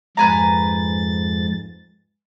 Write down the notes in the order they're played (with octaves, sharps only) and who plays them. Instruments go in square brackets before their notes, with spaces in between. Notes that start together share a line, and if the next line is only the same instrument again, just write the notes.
[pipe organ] F2 G#2 A6 [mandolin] B4 G#5 A#5